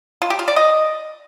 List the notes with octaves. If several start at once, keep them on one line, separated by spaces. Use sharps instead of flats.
F4
G4
F4
D5
D#5